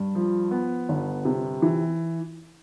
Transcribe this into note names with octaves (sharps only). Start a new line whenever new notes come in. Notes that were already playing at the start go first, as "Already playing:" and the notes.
Already playing: G2
F3
B3
G1
C3
E3